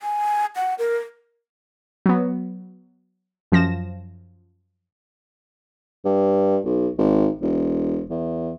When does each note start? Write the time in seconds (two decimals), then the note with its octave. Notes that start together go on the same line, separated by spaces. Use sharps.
0.01 G#5
0.56 F#5
0.79 A#4
2.06 F#3 B3
3.52 F#2 F3 A#6 E7
6.05 G2
6.65 B1
6.98 G#1
7.42 E1
8.10 E2